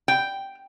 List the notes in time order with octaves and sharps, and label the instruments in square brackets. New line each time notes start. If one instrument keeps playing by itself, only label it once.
[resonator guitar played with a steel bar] G5